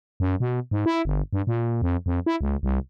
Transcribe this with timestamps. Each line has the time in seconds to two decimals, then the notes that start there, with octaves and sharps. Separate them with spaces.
0.20 F#2
0.40 B2
0.71 G#2
0.86 E4
1.05 G1
1.33 G2
1.47 A#2
1.82 F2
2.06 F2
2.26 E4
2.41 C#2
2.63 C2